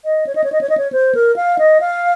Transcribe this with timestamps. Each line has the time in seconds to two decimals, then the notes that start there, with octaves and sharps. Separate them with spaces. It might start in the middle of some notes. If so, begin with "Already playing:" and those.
0.05 D#5
0.27 C#5
0.35 D#5
0.44 C#5
0.52 D#5
0.61 C#5
0.70 D#5
0.78 C#5
0.92 C5
1.15 A#4
1.36 F5
1.59 D#5
1.81 F5